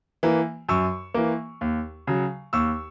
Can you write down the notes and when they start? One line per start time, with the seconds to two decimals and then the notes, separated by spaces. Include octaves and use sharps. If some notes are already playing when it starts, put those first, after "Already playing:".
0.23 E3 A#3
0.69 F#2 C#6 E6
1.14 E3 A#3
1.61 D#2
2.07 C#3 F#3
2.53 D#2 C#6 E6